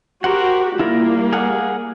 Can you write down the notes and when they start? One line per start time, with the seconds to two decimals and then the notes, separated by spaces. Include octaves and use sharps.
0.24 F#4 G4 A#4 C5 F#5
0.79 G3 A#3 E4 F4 A#4
1.33 G#4 F5 F#5